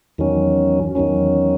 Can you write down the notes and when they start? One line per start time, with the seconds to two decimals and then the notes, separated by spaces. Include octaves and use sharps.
0.18 E2 D#3 F#3 C#4
0.95 E2 D#3 F#3 C#4